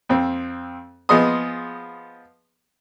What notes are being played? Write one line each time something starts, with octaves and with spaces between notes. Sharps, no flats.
F2 C4
F3 B3 G#4 D#5 C6 D#6